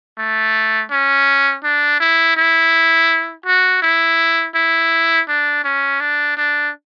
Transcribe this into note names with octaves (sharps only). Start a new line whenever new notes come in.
A3
C#4
D4
E4
E4
F#4
E4
E4
D4
C#4
D4
D4